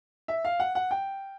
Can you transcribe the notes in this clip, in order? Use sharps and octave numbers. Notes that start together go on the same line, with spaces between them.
E5
F5
F#5
F#5
G5